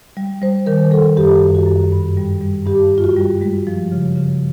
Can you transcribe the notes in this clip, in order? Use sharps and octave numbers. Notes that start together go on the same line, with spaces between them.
G3
G3 C5
D#3 A#4
G3 A4
F#2 G4
F#2
F#4
F#2
G2
G3
G3
G2 G4
G2
F4
F#4
G3
G#3
F3
C#3
C#3